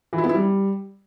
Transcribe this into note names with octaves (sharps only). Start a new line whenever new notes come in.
E3
E4
B3
E4
G3